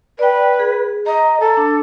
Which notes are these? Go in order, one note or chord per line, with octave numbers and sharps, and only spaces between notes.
B4 D5 G5
G#4
D#5 A#5
A4
D4